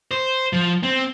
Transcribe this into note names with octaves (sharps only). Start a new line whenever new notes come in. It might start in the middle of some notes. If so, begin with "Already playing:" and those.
C5
F3
C4